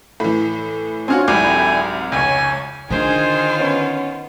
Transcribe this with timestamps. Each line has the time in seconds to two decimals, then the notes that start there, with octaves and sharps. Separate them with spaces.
0.20 A2 E3 B5
1.08 C4 D4 F4 F#4 C#5 G#5 F6
1.28 C2 G#2 D3 F#3 E4 G5 G#5 D6
2.12 F1 C#2 C#5 G#5
2.90 D3 D#3 D4 F4 G#4 C5 G#5
3.57 B3 C#4